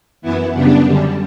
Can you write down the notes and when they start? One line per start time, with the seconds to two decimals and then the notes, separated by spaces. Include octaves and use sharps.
0.22 F#2 E3 B3 E4
0.52 F#2 C#3 G3 B3 D4
0.83 F#2 D3 G3